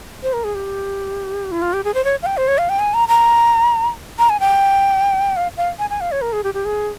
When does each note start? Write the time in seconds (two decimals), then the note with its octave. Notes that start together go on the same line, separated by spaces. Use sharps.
0.23 C5
0.33 A#4
0.44 G#4
0.55 G4
1.52 E4
1.62 F4
1.73 G4
1.84 G#4
1.94 C5
2.04 C#5
2.22 F5
2.26 G5
2.37 C5
2.48 C#5
2.58 F5
2.69 G5
2.79 G#5
2.94 A#5
3.08 A#5
4.18 A#5
4.30 G#5
4.40 G5
5.37 F5
5.57 F5
5.79 G#5
5.90 G#5
6.01 F5
6.12 C#5
6.22 A#4
6.33 G#4
6.44 G4
6.54 G4
6.65 G#4